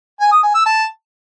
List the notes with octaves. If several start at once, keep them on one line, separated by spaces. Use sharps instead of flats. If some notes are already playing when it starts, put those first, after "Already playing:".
G#5
D#6
G#5
E6
A5